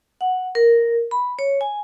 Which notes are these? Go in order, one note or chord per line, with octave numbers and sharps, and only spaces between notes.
F#5
A#4
B5
C#5
G#5